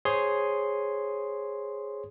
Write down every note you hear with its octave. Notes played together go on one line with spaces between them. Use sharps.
G#4 C5 C#5 C6 D#6